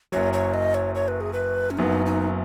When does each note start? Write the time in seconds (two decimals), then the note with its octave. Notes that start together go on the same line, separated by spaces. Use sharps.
0.12 F#1 F#2 F#3 C#5
0.33 C#5
0.54 D#5
0.74 C#5
0.95 C#5
1.08 B4
1.21 G#4
1.33 B4
1.71 C#4
1.77 F#1 F#2 F#3 B3 D#4
2.06 D#4